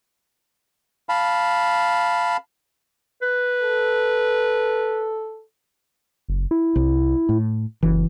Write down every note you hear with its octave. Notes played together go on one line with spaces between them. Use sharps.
F5 A5 B5
B4
A4
F#1
E4
C2
A2
F#1 E3